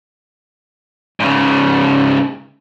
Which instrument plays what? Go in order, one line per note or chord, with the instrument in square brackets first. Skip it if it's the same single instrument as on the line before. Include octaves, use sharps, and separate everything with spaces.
[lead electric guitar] G#2 C#3